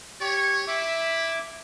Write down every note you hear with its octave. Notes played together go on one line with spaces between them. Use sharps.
G4 C#5 C#6
E4 E5 D6